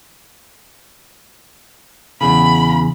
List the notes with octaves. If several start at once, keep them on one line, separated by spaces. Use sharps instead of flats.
E2 C#3 B5